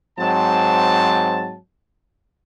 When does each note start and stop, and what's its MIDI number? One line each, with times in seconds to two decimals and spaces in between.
0.19 1.57 44
0.19 1.57 54
0.19 1.57 60
0.19 1.57 81